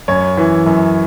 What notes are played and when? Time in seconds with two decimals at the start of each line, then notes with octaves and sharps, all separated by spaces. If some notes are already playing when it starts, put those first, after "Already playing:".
0.08 F#2 C#5
0.37 E3
0.66 F#2